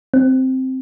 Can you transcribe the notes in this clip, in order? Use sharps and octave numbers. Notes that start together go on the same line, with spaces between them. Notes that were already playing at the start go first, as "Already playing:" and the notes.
C4